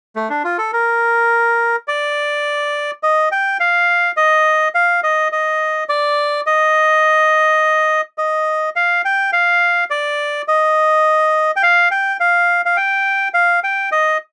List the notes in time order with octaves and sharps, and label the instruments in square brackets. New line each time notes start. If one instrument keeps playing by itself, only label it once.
[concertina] A3
D4
F4
A4
A#4
D5
D#5
G5
F5
D#5
F5
D#5
D#5
D5
D#5
D#5
F5
G5
F5
D5
D#5
G5
F5
G5
F5
F5
G5
F5
G5
D#5